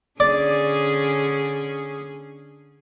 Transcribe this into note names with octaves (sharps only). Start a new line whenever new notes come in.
D3 C#4 G#4 D5